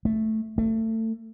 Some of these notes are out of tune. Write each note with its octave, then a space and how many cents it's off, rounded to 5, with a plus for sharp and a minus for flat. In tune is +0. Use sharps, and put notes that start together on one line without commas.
A3 -5
A3 +25